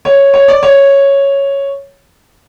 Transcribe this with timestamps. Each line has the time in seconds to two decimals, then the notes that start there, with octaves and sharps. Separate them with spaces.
0.05 C#5
0.34 C#5
0.48 D5
0.63 C#5